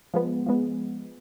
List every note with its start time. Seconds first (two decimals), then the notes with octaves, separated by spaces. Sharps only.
0.14 F3 G#3 B3
0.46 F3 G#3 B3